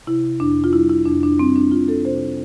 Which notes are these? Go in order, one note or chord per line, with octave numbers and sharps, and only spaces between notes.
C3 E4
F2 D4
F4
G3 E4
E4
F2 D4
D4
G3 C4
D4
F2 F4
A4
C3 C5